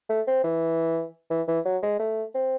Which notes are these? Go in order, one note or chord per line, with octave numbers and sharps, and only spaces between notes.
A3
C4
E3
E3
E3
F#3
G#3
A3
C4